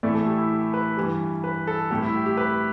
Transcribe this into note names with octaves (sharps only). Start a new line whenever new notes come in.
A2 E3 A3 D5
A4
G4
E4
G4
B4
G2 E3 G3
B4
A4
A2 G3 G4
E4
G4
G4
B4